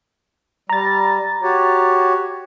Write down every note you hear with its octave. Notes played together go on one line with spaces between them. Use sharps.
G3 A#5 A6
F#4 G4 C#5